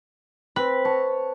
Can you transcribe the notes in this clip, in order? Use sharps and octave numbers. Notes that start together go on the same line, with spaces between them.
C4 B4
C#5 A5